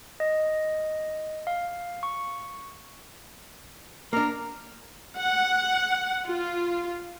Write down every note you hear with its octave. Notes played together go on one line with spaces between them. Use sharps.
D#5
F5
C#6
A#3 D4 A#4
F#5
F4